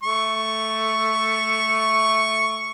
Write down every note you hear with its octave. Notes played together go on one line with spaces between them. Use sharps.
A3 C#6